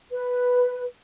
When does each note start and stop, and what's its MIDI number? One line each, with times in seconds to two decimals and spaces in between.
0.12 0.83 71